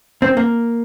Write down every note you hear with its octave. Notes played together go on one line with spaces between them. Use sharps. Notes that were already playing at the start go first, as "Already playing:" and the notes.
C4
A#3